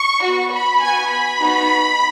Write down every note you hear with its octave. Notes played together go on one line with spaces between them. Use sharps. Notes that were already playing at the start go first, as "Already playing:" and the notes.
Already playing: C#6
B3 F#4
B5
B3 F#4 G#5
B5
B3 D#4 F#4